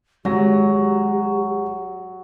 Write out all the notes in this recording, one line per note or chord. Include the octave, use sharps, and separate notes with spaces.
G#1 F#3 G#3 F#4 G4 A#6